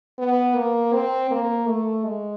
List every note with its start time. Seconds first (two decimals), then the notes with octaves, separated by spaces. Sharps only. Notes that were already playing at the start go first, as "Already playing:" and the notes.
0.19 B3
0.55 A#3
0.94 C4
1.31 A#3
1.67 A3
2.04 G#3